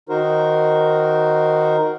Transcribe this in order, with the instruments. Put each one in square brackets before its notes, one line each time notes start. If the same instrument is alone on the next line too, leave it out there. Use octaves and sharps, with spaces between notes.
[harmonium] D#3 D#4 F#4 A#4 C5